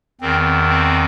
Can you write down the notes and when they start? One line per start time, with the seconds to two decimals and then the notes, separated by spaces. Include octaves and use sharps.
0.21 E2 D#3 C4
0.68 C4